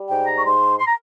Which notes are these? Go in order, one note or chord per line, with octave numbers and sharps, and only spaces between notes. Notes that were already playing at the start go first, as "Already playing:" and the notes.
Already playing: G3
G#2 G5
A#5
C#6
G#2 C6
C6
A#5